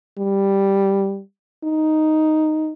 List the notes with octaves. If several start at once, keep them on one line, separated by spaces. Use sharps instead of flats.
G3
D#4